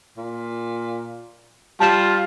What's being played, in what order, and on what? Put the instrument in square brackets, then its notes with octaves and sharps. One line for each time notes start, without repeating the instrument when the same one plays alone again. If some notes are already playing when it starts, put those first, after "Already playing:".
[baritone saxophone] A#2
[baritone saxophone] G3 [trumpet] F4 [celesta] A5 F6 E7